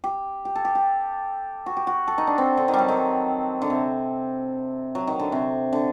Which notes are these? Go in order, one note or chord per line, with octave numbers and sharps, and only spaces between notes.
G4
G4
A4
G4
G4
F#4
G4
F#4
A4
D#4
D4
C4
D3
D#3
F#3 G3
D#3
D3
C3
F#3
D#3
D3
C3
D3